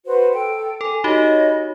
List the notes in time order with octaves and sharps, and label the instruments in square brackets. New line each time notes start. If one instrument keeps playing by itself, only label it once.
[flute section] F#4 B4 C5
A4 G5
[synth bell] A4 [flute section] G#5
[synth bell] D#4 F#4 G4 [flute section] C#5 D#5 B5